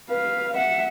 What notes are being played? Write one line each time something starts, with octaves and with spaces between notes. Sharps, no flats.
B4 F5
E5 F#5